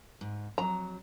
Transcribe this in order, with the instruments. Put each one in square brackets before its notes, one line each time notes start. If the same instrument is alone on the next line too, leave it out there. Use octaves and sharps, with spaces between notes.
[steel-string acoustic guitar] G#2
[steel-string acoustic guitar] F2 F#3 [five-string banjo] A#5